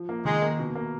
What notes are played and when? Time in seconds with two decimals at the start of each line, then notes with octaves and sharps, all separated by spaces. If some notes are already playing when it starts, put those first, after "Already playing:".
Already playing: F3
0.09 A#3
0.25 D#3 G#3
0.42 A#3
0.59 B2
0.75 A#3